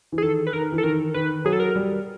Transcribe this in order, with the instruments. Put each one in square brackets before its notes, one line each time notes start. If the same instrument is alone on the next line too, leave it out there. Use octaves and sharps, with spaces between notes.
[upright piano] E3
[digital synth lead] G#4
[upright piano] D#3 [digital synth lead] A4
[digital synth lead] B4
[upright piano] D#3 [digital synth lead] A#4
[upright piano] E3
[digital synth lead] A4
[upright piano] D#3 [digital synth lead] A#4
[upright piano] D#3 [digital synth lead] B4
[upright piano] F#3 [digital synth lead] G#4
[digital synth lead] A4
A#4
[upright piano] G3